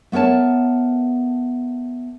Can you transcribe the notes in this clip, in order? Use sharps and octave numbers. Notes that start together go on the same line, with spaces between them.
A3 B3 A#4 C#5 A5